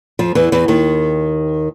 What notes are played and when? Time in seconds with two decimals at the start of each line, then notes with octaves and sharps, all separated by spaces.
0.19 F2 F3
0.35 E2 E3
0.52 E2 E3
0.68 D#2 D#3